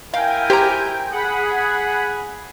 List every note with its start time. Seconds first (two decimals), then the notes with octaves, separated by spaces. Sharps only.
0.14 E4 A#4 F5 G5 G#5
0.50 G4 C5 A#5
1.12 G#4 F#5 B5